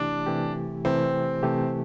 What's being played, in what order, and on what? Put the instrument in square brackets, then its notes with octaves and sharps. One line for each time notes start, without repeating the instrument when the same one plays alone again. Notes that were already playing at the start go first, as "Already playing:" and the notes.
Already playing: [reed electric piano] C3 E3 A3 E4 G4 [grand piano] D4
[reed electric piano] C3 E3 A3 E4 G4
[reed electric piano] C3 E3 A3 E4 G4 [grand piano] C4
[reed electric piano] C3 E3 A3 E4 G4